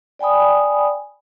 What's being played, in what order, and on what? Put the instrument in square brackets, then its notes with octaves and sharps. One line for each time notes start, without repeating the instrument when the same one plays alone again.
[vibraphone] D5 G5 G#5 B5 D#6